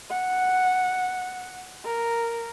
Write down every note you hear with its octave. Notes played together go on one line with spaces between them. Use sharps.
F#5
A#4